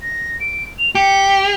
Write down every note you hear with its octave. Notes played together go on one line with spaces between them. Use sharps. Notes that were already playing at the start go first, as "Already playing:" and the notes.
A#6
D7
F7
G4 C#7